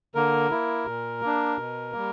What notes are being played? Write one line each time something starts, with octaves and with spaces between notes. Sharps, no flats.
D3 A#3 A#4
A#3 E4
A#2
A#3 D4
B2
G3 A#3